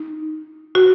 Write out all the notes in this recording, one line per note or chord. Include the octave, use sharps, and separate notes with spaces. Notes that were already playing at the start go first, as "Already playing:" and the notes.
Already playing: D#4
F#4